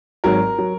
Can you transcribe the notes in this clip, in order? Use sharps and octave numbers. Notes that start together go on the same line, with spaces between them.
G#1 G#2 F#3 A#4
F#3